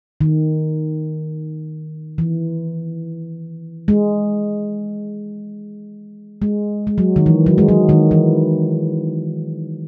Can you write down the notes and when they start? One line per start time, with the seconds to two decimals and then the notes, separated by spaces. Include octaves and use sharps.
0.21 D#3
2.18 E3
3.88 G#3
6.42 G#3
6.87 G#3
6.98 F#3
7.16 D#3
7.26 E3
7.46 F#3
7.58 G#3
7.68 F#3
7.89 D#3
8.11 E3